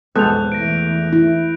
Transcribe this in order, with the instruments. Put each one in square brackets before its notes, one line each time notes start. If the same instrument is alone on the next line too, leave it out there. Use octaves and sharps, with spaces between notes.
[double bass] B1 F2 [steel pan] G#3 B3 A4 [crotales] F#6 G6 F7
[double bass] E2 A3 [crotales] A#6 D7
[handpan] E4